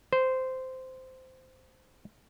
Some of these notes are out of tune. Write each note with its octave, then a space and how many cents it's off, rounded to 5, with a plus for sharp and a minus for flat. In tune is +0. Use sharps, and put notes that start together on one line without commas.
C5 -10